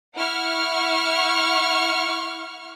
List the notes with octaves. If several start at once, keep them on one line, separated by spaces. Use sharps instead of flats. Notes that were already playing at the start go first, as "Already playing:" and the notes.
E4 F#5 C#6 F6